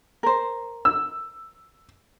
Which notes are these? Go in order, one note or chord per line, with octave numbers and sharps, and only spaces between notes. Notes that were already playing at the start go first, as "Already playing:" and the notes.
A#4 C5
E6